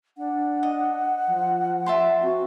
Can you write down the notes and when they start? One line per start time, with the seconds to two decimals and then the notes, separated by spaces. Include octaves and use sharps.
0.18 D4 F#5
0.63 D#5
1.28 F3
1.86 E5 A5 C6
2.23 C4 F#4